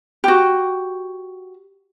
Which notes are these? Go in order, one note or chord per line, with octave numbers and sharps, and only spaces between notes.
F#4 G4